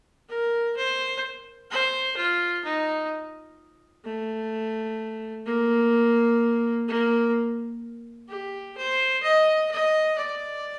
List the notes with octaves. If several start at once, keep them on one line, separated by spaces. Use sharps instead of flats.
A#4
C5
C5
F4
D#4
A3
A#3
A#3
G4
C5
D#5
D#5
D5